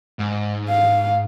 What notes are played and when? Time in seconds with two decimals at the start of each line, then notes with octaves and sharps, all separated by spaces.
0.19 G#2
0.69 F5